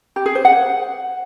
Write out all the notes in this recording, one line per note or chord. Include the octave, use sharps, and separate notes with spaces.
G4
G#4
C5
F#5